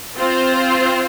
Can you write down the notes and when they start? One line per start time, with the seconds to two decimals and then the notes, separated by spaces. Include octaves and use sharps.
0.16 C4 F4 C5